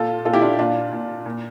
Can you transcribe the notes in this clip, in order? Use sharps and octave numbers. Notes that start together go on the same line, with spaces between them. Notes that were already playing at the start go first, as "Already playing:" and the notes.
Already playing: A#2 F4 A4
A#2 F4 A4
E4 G4
D4 F4
A#2 D4 F4
A#2
A#2